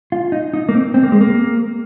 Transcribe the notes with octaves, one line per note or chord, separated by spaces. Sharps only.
F4
D#4
D#4
A#3
C4
C4
A#3
G#3
A#3